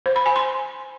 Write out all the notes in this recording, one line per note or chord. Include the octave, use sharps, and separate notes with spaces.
C5
B5
G#5
C6